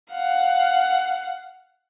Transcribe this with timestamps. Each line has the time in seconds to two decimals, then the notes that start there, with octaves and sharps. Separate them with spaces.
0.11 F5 F#5